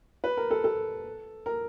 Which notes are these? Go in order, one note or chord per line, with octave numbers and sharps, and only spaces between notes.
B4
A#4
A4
A4
A#4